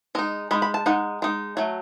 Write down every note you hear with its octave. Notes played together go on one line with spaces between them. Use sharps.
G#3 D#4 D#5
G#3 D#4 B5
B5
A5
G#3 D#4 F#5
G#3 D#4
F#3 A3